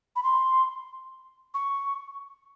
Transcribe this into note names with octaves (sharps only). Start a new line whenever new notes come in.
B5
C6
C#6